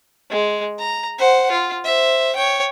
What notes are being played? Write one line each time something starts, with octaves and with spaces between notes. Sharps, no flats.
G#3
A#5
C5 F#5
F4
C5 E5
C#5 G5